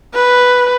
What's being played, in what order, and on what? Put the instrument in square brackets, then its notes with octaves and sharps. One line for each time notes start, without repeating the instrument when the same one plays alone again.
[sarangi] B4